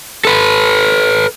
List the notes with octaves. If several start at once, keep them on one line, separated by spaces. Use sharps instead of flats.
A4 B4